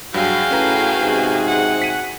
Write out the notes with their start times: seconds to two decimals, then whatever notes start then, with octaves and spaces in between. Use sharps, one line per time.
0.14 G2 F#3 F#4 G#4 F5 G5
0.51 A2 C#4 B4 A#5
1.00 G#2 C3
1.47 F#5
1.82 B6 D#7